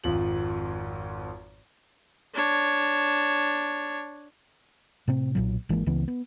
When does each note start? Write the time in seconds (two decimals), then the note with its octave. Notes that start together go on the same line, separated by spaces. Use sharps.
0.04 G#1 F2 F3 F#7
2.35 D4 C#5
5.08 A2 C3 C4
5.35 B1 A#2 F#3
5.69 G#1 E3 G#3 A#3
5.86 C#2 C#3 E3 B3
6.08 B3